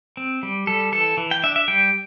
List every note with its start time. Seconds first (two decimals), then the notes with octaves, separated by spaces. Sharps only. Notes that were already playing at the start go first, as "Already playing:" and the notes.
0.17 C4
0.43 G3
0.67 G3 A4
0.92 E3 A4
1.17 E3
1.31 G5
1.44 D4 E5
1.56 E5
1.68 G3 G5